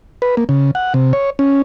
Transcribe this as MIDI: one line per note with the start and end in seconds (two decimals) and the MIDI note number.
0.22 0.35 71
0.37 0.44 58
0.49 0.71 49
0.75 0.93 78
0.94 1.13 48
1.13 1.30 73
1.39 1.62 61